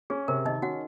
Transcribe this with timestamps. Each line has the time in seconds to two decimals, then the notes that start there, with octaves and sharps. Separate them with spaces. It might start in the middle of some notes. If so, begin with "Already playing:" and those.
0.10 C#4 G#4
0.28 C3 A#4
0.45 D#3 D#4 D#5
0.62 C#4 F#4 F#5